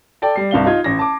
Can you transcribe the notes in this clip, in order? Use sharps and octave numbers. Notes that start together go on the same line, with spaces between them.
A4 D5 G5 A5
G3 C7
C2 G2 F5 G7
D#4 F4 G#6
A1 A#6
A5 D6